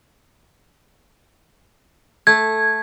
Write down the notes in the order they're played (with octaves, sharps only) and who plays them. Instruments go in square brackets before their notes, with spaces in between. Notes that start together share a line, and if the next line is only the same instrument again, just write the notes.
[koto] A3 [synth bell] G#6